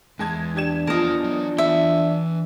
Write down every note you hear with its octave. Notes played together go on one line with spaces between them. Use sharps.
E2 G#3 A5 G#6
D4 G4 G#6 E7
E2 F3 F4 A#4 D#5 A5
F#3
E3 E5 C6